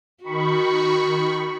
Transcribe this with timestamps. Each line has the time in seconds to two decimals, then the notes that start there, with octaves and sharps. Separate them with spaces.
0.23 D#3 F#4 B5 C#6